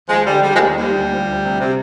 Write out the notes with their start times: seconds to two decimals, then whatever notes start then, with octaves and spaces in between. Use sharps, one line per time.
0.09 D#2 F3 G#3
0.26 D3 G3
0.43 D3 G3
0.55 F3 G#3
0.59 D#2
0.76 D#2 G3
0.93 D2
1.10 F3
1.27 D2
1.43 C3
1.60 C3